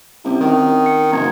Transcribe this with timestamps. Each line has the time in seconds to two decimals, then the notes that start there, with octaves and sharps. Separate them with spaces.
0.24 C2 C#4 E4
0.41 D#3 C4
0.86 C#7
1.12 F#1 A#5 G#6